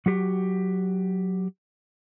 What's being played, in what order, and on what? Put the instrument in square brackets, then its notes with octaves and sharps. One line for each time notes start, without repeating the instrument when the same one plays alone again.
[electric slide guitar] F#3 F#4 G4